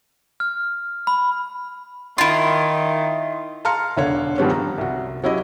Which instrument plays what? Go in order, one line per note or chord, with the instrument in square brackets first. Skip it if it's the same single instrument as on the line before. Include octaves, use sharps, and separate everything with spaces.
[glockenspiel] F6
B5
[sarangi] D#3 [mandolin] E4 F4
[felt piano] F5 A5 A#5 C6 F6 C#7
E1 D3 C#5 F5
G2 D#3 F3 G3 B3 C#4
A#5
C2 F#4
F#3 C#4 E4 G4 D#5